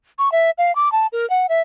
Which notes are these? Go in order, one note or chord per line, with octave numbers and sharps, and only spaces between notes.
C#6
E5
F5
D6
A5
A#4
F#5
E5